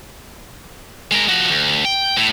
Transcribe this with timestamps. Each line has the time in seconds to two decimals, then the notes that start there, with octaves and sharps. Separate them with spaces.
1.11 G#3 A#4
1.29 F3 F#4
1.50 D2
1.85 G5
2.17 A2